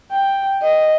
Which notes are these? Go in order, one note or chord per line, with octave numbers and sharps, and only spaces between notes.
G5
D#5